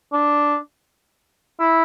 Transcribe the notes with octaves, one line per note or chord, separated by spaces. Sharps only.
D4
E4